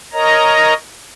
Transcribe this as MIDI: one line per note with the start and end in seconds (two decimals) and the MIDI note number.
0.13 0.74 70
0.13 0.74 73
0.13 0.74 75
0.13 0.74 82